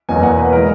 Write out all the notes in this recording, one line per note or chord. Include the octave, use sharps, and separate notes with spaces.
E2 B2 F#3 A#3 G#5
F#5
B4
E3 G#3 A#4